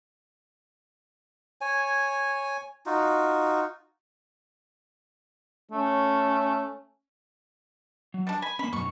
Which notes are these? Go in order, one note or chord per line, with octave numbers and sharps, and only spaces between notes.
C#5 G#5
D#4 F4 F#4
A3 C#4
F#3
G3 D4
G#5 B5
A#3 C#4 B5
F#2 B2 C#6